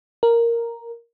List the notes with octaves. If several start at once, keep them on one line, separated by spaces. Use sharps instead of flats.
A#4